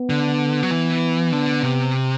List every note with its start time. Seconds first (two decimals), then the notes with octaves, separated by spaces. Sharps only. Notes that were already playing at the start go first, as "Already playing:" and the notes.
Already playing: B3
0.10 D3
0.63 F#3
0.71 E3
1.32 D3
1.63 C3